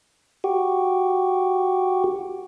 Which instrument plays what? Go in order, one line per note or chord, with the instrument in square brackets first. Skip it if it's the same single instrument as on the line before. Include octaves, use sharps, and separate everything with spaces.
[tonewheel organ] F#4 G4